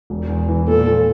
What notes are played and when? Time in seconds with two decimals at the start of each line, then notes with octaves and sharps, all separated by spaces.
0.10 E1
0.29 E2
0.48 E3
0.68 A#2 A4
0.87 F3